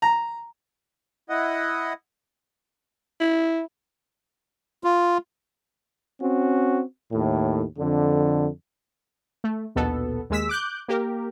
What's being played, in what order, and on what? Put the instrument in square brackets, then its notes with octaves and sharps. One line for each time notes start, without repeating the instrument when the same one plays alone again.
[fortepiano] A#5
[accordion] E4 D#5 F#5
[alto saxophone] E4
[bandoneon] F4
[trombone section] C4 C#4 F#4
D#2 A2
F2 D3
[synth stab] A3
A#1 D#2 B2 B3 A4
D#2 G#3 E6 B6
D6 F#6 G6
A#3 G4 A#4